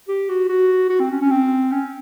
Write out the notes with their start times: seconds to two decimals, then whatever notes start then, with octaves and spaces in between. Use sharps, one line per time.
0.08 G4
0.29 F#4
0.49 F#4
0.90 F#4
1.00 C4
1.11 C#4
1.21 C#4
1.31 C4
1.71 C#4